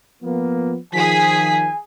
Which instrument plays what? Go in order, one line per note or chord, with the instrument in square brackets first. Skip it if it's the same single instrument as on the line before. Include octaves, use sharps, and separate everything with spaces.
[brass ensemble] F3 A#3 B3
[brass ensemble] D#3 F3 [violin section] G#4 B6 [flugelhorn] G#5